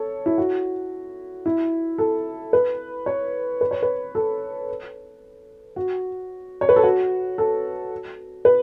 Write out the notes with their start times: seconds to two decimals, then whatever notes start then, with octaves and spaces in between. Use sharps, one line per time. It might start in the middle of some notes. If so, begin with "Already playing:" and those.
Already playing: A4 C#5
0.26 E4
0.38 F#4
1.46 E4
1.98 A4
2.53 B4
3.06 C#5
3.61 B4
3.71 C#5
3.82 B4
4.15 A4
5.76 F#4
6.61 C#5
6.69 B4
6.76 A4
6.83 F#4
7.38 A4
8.45 B4